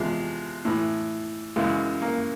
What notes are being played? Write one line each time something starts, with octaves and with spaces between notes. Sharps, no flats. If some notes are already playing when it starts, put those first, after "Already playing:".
Already playing: E2 C3 F3 G#3
A2 E3
F#2 C#3 E3 G#3
A#3